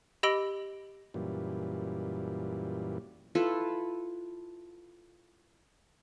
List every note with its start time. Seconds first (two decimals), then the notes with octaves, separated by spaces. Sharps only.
0.23 G4 D#5 B5 E6 D7 G7
1.14 F#2 A#2 E3 G3
3.35 E4 F4 A4 B4